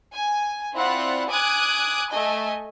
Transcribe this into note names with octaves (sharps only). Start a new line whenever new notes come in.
G#5
C4 E4 F4 D5 F#5
G#5 D6 D#6 F#6 G#6
A3 D#5 G#5